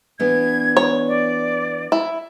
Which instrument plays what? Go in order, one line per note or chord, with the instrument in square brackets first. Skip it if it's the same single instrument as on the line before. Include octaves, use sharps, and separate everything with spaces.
[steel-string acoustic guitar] E3 B3 D4 [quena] G#6
[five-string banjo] C#5
[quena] D5
[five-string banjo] E4